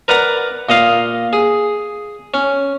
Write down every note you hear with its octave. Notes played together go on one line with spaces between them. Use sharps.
A#4 B4 D5 F#5 A#5
A#2 D#5 F5
G#4
C#4